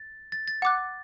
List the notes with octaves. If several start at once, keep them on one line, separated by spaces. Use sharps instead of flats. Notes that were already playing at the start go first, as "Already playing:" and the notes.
Already playing: A6
A6
A6
F#5 D6 F#6